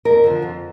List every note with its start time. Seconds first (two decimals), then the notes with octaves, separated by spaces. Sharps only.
0.05 F2 A#4
0.24 D3 F3
0.42 F2